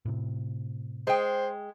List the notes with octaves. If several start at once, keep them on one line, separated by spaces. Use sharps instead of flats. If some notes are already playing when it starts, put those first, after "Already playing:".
A2 C3
G#3 C5 G5